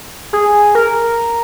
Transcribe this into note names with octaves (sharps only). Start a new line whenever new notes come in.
G#4
A#4